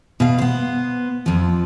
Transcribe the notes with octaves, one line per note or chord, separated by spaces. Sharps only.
B2 F5
B3 C5
F2 F3